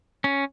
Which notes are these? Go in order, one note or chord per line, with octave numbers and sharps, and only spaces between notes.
C#4